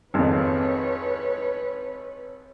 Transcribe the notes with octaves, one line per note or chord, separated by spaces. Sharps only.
G#1 F2 B4 C#5